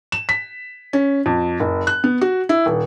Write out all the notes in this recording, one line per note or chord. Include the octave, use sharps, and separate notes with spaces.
E7
B6
C#4
F2
F#1
F#6
B3
F#4
E4
D#1